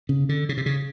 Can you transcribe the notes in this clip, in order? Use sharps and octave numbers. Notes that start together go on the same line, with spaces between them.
C#3
D3
C#3
C3
C#3